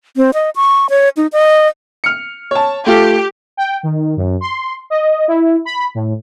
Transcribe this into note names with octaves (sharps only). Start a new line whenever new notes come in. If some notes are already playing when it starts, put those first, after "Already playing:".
C4
D#5
C#6
C#5
D#4
D#5
F6 C#7
C#5 A5
A3 F4 G4 A4
G5
D#3
F#2
C6
D#5
E4
B5
A2